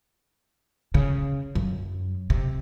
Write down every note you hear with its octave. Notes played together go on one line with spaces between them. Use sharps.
C#3
F#2
C3